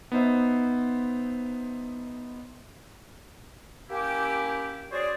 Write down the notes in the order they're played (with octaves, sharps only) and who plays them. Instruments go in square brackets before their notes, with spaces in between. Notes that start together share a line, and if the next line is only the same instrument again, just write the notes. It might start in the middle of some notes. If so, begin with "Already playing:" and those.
[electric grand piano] B3 D#4 C5 E5
[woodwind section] A#3 C#4 E4 G4
C#4 F#4 G#4 C5 D5